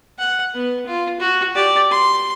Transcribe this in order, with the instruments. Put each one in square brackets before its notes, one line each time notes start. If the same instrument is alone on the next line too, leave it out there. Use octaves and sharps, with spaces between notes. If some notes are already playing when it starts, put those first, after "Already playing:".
[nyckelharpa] F#5
B3
F4
F#4
G4 D5
C6